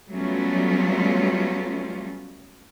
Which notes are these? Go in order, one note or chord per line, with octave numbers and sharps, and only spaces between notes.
F#3 G3 A3 B3 C#4 F4